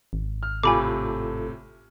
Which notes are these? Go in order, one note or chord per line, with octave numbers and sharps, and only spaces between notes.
G#1
F6
A2 C3 F4 A4 G#5 B5 D6